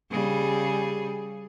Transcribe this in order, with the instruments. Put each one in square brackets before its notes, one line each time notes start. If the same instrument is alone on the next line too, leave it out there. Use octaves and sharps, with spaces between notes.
[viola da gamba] C#3 G3 G#4